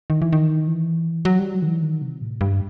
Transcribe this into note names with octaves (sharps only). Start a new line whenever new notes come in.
D#3
E3
D#3
E3
F#3
G3
F#3
D#3
E3
D#3
C3
A2
G2